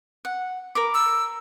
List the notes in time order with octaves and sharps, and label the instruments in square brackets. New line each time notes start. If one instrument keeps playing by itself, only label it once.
[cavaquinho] F#5
A#4 B5 D6
[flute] E6